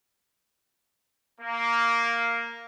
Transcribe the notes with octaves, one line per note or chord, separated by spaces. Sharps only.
A#3